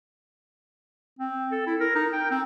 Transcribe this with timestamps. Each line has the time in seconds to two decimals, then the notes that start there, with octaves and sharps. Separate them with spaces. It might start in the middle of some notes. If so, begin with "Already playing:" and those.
1.19 C4
1.52 A4
1.66 E4
1.80 A#4
1.95 D#4
2.13 G5
2.30 C4